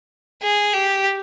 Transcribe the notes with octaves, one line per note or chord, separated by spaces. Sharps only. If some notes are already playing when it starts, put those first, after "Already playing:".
G#4
G4